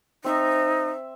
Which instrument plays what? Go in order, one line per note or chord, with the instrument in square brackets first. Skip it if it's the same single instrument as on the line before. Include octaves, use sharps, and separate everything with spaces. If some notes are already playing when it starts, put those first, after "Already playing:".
[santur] C4 E5 [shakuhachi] D#4